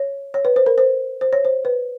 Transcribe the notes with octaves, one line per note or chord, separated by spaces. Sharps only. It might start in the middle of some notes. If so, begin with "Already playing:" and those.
Already playing: C#5
C#5
B4
C5
A#4
C5
C5
C#5
C5
B4